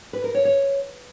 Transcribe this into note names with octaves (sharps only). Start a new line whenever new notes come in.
B4
A#4
C#5
C#5